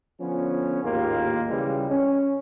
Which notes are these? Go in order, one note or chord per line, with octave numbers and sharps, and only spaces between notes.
D3 F3 B3 C#4
A1 D#2 G#2 A#3 F4
C#3 E3 G3 G#3
C#4